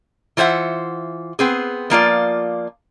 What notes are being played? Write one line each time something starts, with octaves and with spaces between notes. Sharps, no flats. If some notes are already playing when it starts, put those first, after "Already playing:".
E3 F4 C5 E5 F#5
B3 C4 G#4
F3 A#3 F4 D5